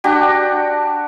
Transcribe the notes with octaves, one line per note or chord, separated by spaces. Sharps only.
D4 F#4 G4